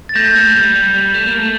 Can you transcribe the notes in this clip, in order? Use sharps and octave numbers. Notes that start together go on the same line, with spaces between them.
A6
A3 G6 A#6
A#3
A3
G3
G3
G3
A3
A#3
A3